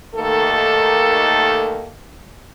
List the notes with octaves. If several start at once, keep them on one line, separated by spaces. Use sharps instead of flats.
D#2 D#3 A3 A#3 A4